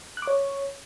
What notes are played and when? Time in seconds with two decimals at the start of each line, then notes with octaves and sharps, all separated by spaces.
0.17 F#6
0.22 D6
0.27 C#5